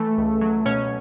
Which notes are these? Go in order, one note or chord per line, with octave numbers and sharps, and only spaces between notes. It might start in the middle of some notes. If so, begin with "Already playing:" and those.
Already playing: E3 A3 A4
C#2
F#3
B2 C#4 C#5